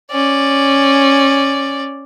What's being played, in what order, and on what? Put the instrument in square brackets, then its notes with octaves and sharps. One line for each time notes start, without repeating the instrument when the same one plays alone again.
[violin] C#4 D5